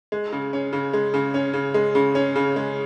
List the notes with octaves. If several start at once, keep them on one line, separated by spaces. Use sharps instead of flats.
G#3
C#3
C#4
C#3
G#3
C#3
C#4
C#3
G#3
C#3
C#4
C#3
G#3